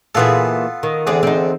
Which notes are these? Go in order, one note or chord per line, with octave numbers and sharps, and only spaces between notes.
A#2 E3 B3 F4 G#4 A4
D#3
E2 D3 C4 G#4
C4 D#4